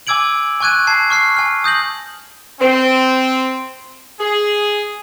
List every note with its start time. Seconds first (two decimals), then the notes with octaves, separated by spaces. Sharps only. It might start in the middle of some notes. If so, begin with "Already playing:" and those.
0.07 G#5 D6 E6 G#6 D7 F#7
0.60 G#5 C#6 F#6 G#6 D#7
0.87 A5 G#6 C7
1.10 C#6 F6 C7
1.37 G#5 F6
1.64 D#6 G6 A#6 F#7
2.60 C4
4.20 G#4